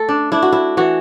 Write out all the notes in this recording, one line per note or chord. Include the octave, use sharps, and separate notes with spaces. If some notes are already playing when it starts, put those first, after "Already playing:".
Already playing: A3 A4
D4
D4 E4
F#4
E4
E3 F#4